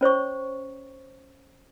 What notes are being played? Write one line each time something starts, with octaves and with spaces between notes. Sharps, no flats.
C#4 C5 C#5 C#6